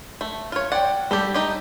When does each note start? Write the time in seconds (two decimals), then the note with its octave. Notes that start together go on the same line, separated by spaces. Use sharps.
0.21 A3
0.52 F4 C#5
0.72 D5 F#5 G5
1.11 G3 G4 A4 G7
1.34 A3 D#4 G4